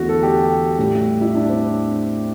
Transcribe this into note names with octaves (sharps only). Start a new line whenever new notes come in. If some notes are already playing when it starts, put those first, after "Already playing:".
Already playing: E2 D3 A3 E4 F#4
A4
G4
A2 G3
E4
D4
C4